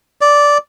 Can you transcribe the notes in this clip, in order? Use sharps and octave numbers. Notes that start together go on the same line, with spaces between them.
D5